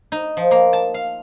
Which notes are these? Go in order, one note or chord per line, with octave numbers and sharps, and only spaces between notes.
D#4
F3
A#3
A5
F5